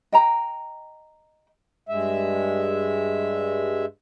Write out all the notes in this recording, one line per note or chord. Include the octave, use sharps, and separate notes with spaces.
D#5 G5 A#5
G2 G#3 E5